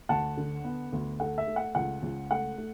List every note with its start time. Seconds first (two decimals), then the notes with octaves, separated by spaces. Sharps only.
0.09 D2 F#5 A5
0.37 D3
0.64 B3
0.92 D2
1.20 A3 F#5
1.38 E5
1.47 A3
1.56 F#5
1.75 C#2 F#5
2.02 C#2
2.31 A3 F#5
2.58 A3